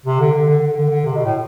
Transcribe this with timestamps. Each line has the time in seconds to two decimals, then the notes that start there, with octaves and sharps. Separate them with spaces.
0.06 C3
0.20 D3
0.33 D3
0.48 D3
0.61 D3
0.76 D3
0.90 D3
1.05 C3
1.15 B2
1.24 A2